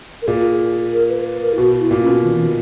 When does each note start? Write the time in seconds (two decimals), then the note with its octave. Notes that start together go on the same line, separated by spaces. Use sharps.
0.22 A#4
0.27 A#2 G#4
0.93 A#4
1.09 B4
1.26 B4
1.41 A#4
1.53 E4
1.57 B2 F#4
1.79 E4
1.91 A#2
2.01 C#4
2.07 B2
2.23 D#3
2.33 E3
2.42 D#3